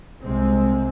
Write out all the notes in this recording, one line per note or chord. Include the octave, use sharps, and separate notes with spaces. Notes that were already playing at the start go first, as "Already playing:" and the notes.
C2 C3 G#3 C4